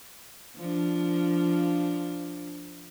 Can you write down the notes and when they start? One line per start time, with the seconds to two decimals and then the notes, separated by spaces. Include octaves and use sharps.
0.56 F3 D4